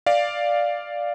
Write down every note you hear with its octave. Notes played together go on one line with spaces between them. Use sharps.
D5 F5